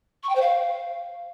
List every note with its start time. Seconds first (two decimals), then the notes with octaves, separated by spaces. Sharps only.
0.23 C#6
0.29 G5
0.35 C5
0.41 F5